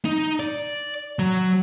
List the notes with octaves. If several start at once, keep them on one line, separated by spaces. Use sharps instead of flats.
D#4
D5
F#3